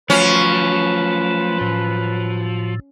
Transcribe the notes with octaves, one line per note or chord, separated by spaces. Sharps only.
F3 F#3 A3 C#4 B4
A2